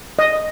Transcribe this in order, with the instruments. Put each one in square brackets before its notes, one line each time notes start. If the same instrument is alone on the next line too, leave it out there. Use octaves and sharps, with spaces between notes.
[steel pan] D#5